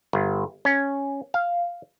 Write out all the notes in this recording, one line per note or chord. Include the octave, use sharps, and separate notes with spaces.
G1
C#4
F5